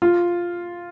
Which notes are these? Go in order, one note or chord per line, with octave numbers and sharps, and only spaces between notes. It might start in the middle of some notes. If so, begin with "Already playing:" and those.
F4